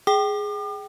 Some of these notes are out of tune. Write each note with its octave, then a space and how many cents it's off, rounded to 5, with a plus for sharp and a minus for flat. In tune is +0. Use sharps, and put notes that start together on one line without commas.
G#4 +0 G5 -15 D6 +45